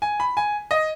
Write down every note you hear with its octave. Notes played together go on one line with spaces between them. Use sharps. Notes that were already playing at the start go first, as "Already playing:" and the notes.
G#5
B5
G#5
D#5